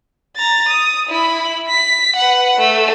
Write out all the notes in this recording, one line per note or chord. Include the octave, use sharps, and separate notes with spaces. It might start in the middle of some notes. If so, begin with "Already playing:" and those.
A#5 A6
D#6
E4 B5
B6
B4 F#5
A3